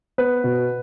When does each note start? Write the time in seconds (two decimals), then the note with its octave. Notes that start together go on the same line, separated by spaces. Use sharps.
0.18 B3 B4
0.44 B2